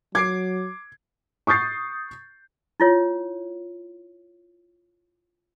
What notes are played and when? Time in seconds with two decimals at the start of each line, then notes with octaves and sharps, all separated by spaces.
0.15 F#3 D6 G#6 C7 D7
1.47 C#6 D#6 G6 A6 C7
2.80 E4 F4 C#5